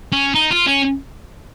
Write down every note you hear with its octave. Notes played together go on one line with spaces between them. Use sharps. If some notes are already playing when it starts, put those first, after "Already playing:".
C#4
D#4
F4
C#4